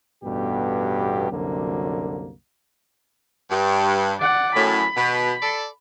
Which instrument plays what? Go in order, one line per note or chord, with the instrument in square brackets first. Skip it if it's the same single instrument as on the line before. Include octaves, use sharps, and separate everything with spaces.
[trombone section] A1 G2 B2 B3 G4 A4
C2 F#2 D3 F#3 A#3
[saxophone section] G2
[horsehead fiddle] D5 F#5
[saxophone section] F#2 A2 [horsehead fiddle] B5
[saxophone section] B2
A4 D5